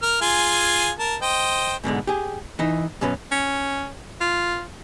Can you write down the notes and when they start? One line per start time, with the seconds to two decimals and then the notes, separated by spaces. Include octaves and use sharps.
0.02 A#4 F6
0.21 F4 G#4 G#5
0.99 A#4 A5
1.22 C5 D#5 G5
1.84 G#2 B2 D3 G#3
2.07 G4 G#4
2.59 E3 D#4
3.01 F#2 B2 C#4 B4
3.31 C#4
4.21 F4